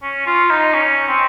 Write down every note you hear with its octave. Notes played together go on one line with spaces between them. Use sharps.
C#4
F4
D#4
C#4
C4